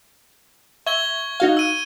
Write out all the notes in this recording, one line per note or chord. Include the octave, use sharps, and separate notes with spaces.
E5 C#6 G#6 G7
D#4 F#4 F5
E6 D#7